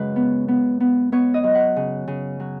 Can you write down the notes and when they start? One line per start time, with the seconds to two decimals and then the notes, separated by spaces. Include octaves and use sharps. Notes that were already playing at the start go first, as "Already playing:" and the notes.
Already playing: F#2 C#3 G#3 B4
0.16 B3
0.48 B3
0.80 B3
1.12 B3 C#5
1.34 D#5
1.44 F#3
1.55 F#5
1.76 C#3
2.08 C#3
2.40 F#3